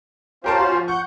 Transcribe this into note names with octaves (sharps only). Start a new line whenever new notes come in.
C#4 F4 G4 A#4 C5 A5
F#4 F5
F3
F#5 C#6 G6